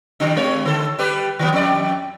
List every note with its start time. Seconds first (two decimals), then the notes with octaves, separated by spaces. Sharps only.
0.20 D#3 G3 D4
0.37 G#3 C#5
0.65 D3 A4
0.99 G3 G4 B4
1.39 D#3 F#3 B3
1.53 F2 D5